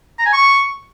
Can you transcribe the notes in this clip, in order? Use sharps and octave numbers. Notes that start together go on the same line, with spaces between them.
A#5
G#5
C#6